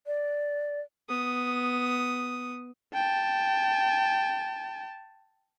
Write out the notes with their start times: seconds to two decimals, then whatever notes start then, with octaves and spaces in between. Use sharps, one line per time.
0.06 D5
1.09 B3 D#6
2.94 G5 A5